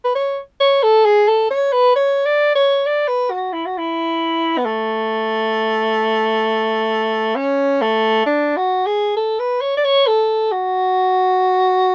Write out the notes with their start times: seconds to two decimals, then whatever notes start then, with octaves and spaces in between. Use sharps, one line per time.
0.04 B4
0.15 C#5
0.60 C#5
0.83 A4
1.05 G#4
1.28 A4
1.50 C#5
1.72 B4
1.96 C#5
2.25 D5
2.55 C#5
2.86 D5
3.08 B4
3.30 F#4
3.53 E4
3.66 F#4
3.78 E4
4.58 B3
4.66 A3
7.36 C#4
7.81 A3
8.26 D4
8.57 F#4
8.86 G#4
9.17 A4
9.39 B4
9.61 C#5
9.77 D5
9.84 C#5
10.07 A4
10.52 F#4